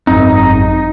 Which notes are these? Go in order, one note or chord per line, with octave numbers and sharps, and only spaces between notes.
G#1 F#2 C4 D#4